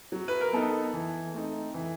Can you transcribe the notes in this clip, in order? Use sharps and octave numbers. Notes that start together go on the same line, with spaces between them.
F#3
B4
A#4
B3 D#4 A4
E3
A3 C4 D#4
E3